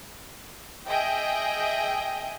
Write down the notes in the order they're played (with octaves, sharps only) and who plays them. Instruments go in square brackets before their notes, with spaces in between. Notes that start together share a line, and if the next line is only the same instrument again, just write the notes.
[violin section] G#4 D#5 E5 G5